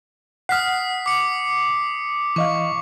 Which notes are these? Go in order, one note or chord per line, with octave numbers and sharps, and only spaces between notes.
F#5 D#6 F6 B6 C7
D6 C#7
E3 D#5 F5 C#6